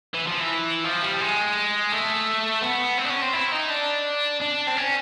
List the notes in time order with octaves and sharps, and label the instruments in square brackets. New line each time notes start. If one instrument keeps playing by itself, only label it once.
[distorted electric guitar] E3
F3
E3
F3
G3
G#3
A3
B3
C4
D4
C#4
C4
E4
D#4
D4
D4
C4
C#4